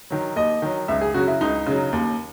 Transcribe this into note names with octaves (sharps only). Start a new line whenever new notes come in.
D#3 F#3
D#2 D#5
D#3 F#3
C#2 E5
G#4
C#3 F#3 F#4
E4
C#2 D#4
C#3 F#3
D#2